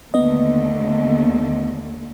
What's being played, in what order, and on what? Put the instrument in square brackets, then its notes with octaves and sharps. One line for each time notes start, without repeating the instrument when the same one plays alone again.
[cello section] D#2 D3 A3 [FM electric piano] B3 D#5